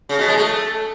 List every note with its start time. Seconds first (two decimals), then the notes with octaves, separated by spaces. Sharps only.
0.09 C#3
0.19 B2
0.28 G#3
0.38 A3